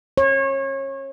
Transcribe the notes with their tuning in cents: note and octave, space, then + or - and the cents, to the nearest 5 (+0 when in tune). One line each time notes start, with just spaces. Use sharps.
C#5 -30